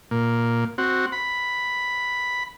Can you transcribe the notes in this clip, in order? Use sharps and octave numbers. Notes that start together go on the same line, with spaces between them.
A#2
C4 F#4
B5